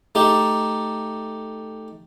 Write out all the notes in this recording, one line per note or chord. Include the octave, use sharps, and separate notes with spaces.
A3 D#4 G4